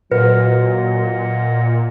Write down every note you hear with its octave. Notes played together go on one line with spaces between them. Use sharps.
A#2 F#3 B4 D#5 F#5